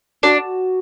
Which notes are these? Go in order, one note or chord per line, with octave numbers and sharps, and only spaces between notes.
D4 F#4